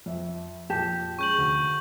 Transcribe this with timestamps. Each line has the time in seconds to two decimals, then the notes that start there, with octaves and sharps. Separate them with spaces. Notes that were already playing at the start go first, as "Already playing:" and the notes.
0.06 F2 E5
0.70 F2 A#2 G4 A5
1.19 G#3 C#4 C#6 G6 F#7
1.38 D2